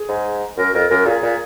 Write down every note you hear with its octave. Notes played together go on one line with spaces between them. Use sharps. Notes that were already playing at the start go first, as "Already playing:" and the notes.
Already playing: G#4
G#2
F#2 A#4
F2 A#4
F#2 A#4
A#2 G#4
A#2